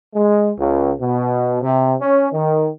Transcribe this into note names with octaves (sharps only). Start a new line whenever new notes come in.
G#3
C#2
B2
C3
C#4
D#3